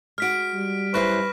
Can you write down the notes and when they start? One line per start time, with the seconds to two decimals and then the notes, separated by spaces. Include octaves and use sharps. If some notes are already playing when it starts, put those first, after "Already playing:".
0.18 G#3 F#4 F6 B6 D7
0.54 G3
0.94 F#2 E4 B4 C5 C#6 F#6 A#6